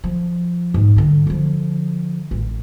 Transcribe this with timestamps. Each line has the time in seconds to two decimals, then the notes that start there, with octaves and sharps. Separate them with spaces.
0.04 F3
0.74 G#2
0.96 G2 D3
1.27 D3 F3
2.31 A1